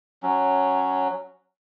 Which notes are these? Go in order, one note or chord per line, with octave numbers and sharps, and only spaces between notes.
F#3 C#4